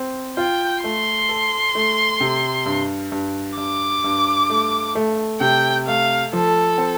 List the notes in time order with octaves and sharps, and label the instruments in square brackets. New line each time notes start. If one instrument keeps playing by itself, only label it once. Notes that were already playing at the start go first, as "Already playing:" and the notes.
Already playing: [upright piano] C4
[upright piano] F4 [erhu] G5
[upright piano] A3 [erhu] C6
[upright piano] A4
A3
C3
G2
G2
[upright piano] G2 [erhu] D6
[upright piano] G2
A3
A3
[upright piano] C3 [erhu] G5
[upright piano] A3 [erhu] F5
[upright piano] F3 [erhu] A4
[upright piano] C4